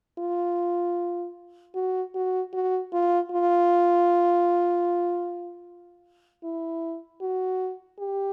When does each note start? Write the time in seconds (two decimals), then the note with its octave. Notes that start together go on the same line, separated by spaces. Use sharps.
0.19 F4
1.75 F#4
2.15 F#4
2.53 F#4
2.93 F4
3.31 F4
6.44 E4
7.22 F#4
7.99 G4